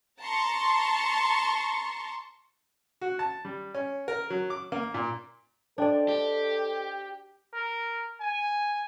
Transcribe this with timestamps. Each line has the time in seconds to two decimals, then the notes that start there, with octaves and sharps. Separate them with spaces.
0.21 A5 A#5 C6 C#6
3.01 F#4
3.19 A5
3.45 G3
3.75 C#4
4.08 A#4
4.30 F#3
4.50 D6
4.72 A#3
4.94 A#2
5.78 D4 A4 C5 D5 D#5 G5
6.08 G4
7.54 A#4
8.21 G#5